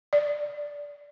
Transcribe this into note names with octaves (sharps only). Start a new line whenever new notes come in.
D5